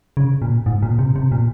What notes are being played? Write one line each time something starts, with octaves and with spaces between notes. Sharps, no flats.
C#3
A#2
G#2
A#2
C3
C3
A#2